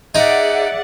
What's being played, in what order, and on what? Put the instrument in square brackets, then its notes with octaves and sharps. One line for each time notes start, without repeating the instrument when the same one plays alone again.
[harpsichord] D#4 [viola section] G#4 D5 F#5 [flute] E5